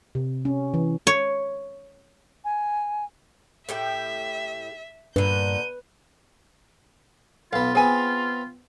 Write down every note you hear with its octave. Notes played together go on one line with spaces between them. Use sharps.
C3
C#4
E3
C#5
G#5
A2 G4 E5 G5
G2 A#2 D3 B4 G6 D#7
B1 B3 F4 F5
B3 C4 G#4 G#5